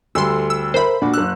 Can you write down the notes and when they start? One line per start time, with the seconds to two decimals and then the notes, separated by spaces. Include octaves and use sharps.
0.15 D2 G3 A4 C6 E6
0.50 E6
0.74 A#4 C5 E5 B5
1.02 A#2 D4 F#4
1.14 F#1 E6 F#6